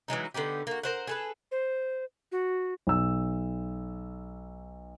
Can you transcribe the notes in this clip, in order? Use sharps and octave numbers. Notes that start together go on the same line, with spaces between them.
E3 F#3 G#3 D#4
D3 B3 D#4 G4
A#3 F#4
A#4 C5 F#5
G#4 A4 B4
C5
F#4
B1 E6